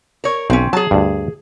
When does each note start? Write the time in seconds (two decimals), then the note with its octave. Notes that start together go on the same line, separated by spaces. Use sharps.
0.24 A#4 C#5
0.50 B1 C4 C#4
0.73 F#3 G#4 A5
0.91 D2 G2